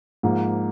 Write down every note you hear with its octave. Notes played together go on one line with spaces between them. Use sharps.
G#2 F3 A#3